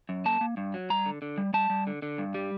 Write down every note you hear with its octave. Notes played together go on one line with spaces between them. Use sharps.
F#2
A#3 A5
A#3
G2
F#3
G3 A#5
D3
D3
G3
G3 A5
G3
D3
D3
G2
G3